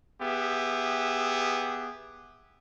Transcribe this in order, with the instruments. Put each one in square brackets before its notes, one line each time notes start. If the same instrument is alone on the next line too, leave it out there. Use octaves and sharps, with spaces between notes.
[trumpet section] B3 G4 G#4 E5